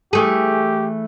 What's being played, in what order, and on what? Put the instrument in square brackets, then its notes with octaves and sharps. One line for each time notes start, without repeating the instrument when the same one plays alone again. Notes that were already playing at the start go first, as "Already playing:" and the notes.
[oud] E3 A3 G#4 [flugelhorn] G4